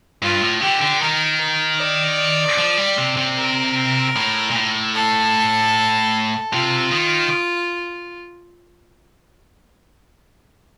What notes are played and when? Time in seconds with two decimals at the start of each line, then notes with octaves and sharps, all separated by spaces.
0.22 G2 F4
0.41 A2
0.61 D3 G4
0.81 D3
1.01 D#3 A#4
1.40 A#4
1.80 D5
2.58 F3
2.77 G3
2.98 C3
3.17 C3
3.37 A#4
4.16 A2
4.51 A#2
4.55 A2
4.94 A4
6.52 C3 F4
6.91 D#3